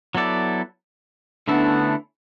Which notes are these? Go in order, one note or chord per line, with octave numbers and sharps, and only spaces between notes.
F#3 B3 E4 A4 D5
D3 A3 B3 C#4 D4 E4 A4